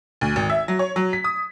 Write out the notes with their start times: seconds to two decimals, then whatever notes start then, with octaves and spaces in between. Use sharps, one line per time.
0.21 D2
0.36 G#1
0.49 E5
0.68 F#3
0.79 C#5
0.96 F#3
1.13 B6
1.24 D#6